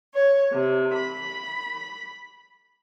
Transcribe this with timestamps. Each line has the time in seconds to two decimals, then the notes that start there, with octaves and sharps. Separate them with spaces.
0.13 C#5
0.53 C3
0.93 B5